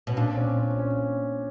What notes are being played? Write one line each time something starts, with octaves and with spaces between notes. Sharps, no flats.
B2 C#4
A#2 D4
C4
C#4
C#4
C#4